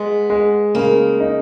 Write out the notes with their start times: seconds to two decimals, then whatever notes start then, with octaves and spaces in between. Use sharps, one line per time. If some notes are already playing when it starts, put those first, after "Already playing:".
Already playing: G#3 B3
0.30 G#3
0.75 C#3 A#3
1.20 D#4